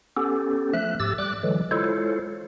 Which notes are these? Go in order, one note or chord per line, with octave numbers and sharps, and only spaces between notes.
B3 C#4 G4 A4
F3 A3 E5 F#6
G#2 G4 E6 A6
G3 D6 F#6
D3 E3 F#3 G#3
G#3 E4 F4 A4 C5 C#5